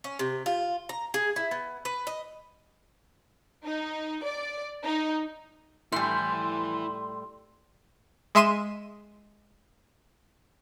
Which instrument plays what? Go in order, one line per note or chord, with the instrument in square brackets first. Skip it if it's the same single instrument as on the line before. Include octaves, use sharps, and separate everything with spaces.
[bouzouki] C#4
C3
F4
A#5
G#4
E4
B3
B4
D#5
[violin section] D#4
D5
D#4
[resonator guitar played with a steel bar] A2 G3 [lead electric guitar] E4 G#5 [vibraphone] C6
[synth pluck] G#3 E5 C6 D#7 E7